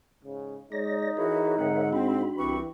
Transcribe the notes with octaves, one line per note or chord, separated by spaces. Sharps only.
G#2 C#3
G#3 D#4 C#5 D5 A#6
E3 E4 F#4 G#4 A#4 C#5 E5
G#2 D3 C4 F#5
C4 D4 F#4 B5
C2 E3 C4 G4 B4 C#6